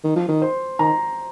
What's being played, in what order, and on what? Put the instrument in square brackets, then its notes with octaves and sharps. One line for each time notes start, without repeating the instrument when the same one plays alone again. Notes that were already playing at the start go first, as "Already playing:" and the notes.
[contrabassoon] D#3
F3
D#3
[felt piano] C5
[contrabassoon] D#3 [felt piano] A#5